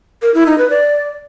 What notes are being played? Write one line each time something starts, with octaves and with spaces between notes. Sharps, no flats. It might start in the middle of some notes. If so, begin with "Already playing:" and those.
A#4
E4
D#4
B4
D5